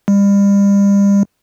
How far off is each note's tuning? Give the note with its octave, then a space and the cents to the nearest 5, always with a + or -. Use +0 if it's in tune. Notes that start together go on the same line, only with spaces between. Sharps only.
G3 +35